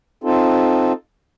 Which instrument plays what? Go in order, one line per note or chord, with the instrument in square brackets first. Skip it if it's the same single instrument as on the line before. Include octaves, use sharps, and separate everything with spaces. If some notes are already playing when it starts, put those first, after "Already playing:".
[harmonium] C4 D#4 F4 A4